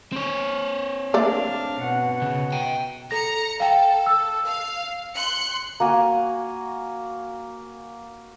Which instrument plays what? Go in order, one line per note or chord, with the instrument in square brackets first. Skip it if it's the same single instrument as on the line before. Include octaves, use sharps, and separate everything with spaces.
[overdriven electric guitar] C4 C#5
[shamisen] A3 A#3 D5 [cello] D4 F5
[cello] B2 F#5
[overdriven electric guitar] C#3
G5 A#5
[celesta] A4 A#6 [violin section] A#5 C#7
[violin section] A4 [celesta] F5 G5
[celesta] E6
[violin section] F5 C7
C6 F#6 C#7
[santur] A#3 F#4 G#5